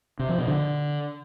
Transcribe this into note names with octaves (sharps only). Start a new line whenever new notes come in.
C3
F3
B2
D3